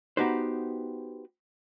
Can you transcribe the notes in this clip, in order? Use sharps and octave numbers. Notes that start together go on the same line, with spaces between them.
B3 D#4 F#4 G4 B4 C5